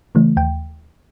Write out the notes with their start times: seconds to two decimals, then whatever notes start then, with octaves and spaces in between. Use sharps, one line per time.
0.15 C#3 E3 A3
0.37 D#2 G5